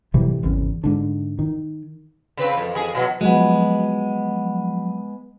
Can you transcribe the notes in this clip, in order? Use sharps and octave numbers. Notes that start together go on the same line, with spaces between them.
A2 C3 E3 G3
G#1 E2 C#3
G#2 D3
D#3
C#3 C4 B4
F2
F2 G#4
B2 F#3
F3 F#3 G#3 B3